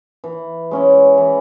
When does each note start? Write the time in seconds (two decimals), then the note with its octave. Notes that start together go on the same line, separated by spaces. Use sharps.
0.24 E3
0.71 G#3 C#4 E4
1.18 E3